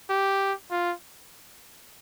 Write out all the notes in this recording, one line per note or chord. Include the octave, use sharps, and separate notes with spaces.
G4
F4